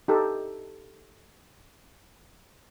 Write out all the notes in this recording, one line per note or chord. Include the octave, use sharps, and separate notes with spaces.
D#4 G4 A4